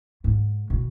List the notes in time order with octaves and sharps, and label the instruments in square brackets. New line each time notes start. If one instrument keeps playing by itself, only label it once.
[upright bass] G#2
B2